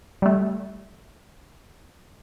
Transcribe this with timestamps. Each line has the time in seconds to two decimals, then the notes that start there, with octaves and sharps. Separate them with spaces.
0.22 G3 A3